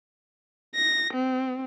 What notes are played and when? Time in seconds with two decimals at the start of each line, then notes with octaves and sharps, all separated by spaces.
0.75 A#6
1.13 C4